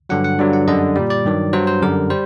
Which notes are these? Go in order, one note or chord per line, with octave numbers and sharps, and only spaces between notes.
G2 D3 F#3 F#5
F#5
G2 D3 F#3 D5
F#5
F#2 D3 G3 D#5
A#2 G3 D5
D5
G2 D#3 F#3
G2 F#3 C5
C5
F#2 D3 G3 A#4
G3 C5